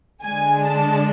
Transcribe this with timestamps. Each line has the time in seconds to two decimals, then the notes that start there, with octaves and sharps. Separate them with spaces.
0.23 D3 G#3 D4 G#5
0.64 A5